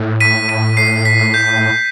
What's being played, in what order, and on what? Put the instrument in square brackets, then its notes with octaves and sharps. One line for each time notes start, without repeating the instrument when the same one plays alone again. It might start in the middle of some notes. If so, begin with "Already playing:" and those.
Already playing: [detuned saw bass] A2
[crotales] B6 D#7
B6 D#7
C7
B6
G6